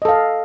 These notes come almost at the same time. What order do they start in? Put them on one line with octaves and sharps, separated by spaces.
D#5 A4 F5